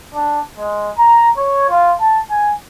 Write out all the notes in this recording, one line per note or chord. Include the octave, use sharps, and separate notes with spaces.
D4
G#3
A#5
C#5
F4
A5
G#5